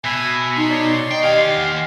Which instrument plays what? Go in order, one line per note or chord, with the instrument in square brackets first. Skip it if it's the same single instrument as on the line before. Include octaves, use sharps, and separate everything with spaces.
[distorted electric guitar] B2 [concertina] E5 B5 [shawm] G#5
[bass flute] D#4 [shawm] C6
[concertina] C#5 D5 C#6
[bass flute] D#5 [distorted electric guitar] G5
[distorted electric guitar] D#3 F5 [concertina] G4 G#5 F6
[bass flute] F#5